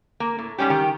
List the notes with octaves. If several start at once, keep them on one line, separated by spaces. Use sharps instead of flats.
A#3
A2
G#2 E3 G3 C#4 G4
D#3 G4